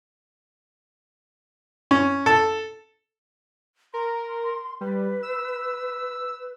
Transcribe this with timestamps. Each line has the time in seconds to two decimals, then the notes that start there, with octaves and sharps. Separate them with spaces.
1.91 C#4
2.26 A4
3.94 A#4 C6
4.81 G3 B4
5.23 E6